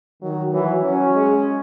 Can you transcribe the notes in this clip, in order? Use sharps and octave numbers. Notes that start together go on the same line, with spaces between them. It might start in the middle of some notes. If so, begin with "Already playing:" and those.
D#3 F#3
E3 F#3
F#3 C#4
G#3